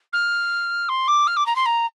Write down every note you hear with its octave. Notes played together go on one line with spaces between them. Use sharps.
F6
C6
D6
F6
D6
A#5
C6
A#5